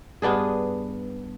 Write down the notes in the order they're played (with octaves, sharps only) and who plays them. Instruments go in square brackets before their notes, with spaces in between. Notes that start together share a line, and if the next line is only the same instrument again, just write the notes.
[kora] G2 B3 D4 G#4